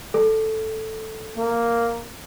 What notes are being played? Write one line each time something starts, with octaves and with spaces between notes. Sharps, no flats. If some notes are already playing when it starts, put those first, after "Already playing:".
A4
A#3